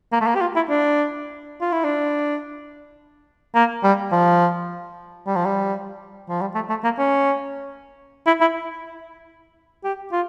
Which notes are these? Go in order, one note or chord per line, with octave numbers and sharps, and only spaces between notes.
A#3
A3
A#3
G4
F4
E4
D4
F4
E4
D4
A#3
G3
F3
G3
F3
G3
F3
G3
A3
A3
A#3
C#4
E4
E4
G4
F4